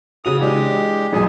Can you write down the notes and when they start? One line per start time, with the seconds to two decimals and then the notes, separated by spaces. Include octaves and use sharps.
0.25 C#3 F#4 D#6 F7
0.41 E3 G#3 D4 G4
1.13 A1 F#2 B2 G#4